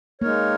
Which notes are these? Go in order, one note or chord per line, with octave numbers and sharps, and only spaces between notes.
G#3 A#3 D#4 A#4 C#5